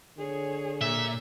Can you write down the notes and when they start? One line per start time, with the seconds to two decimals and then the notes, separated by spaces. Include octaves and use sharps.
0.18 D3 G#4 C#5
0.81 A#2 E5